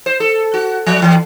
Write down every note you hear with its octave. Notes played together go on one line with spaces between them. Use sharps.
C5
A4
F#4
F3
E3